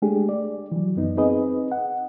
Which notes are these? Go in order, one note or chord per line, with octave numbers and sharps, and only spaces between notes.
G#3 A3 D4 G4 G#4
D5
E3 F#3
F#2 B3 D#4
C4 D#4 G#4 B4 D#5
F#5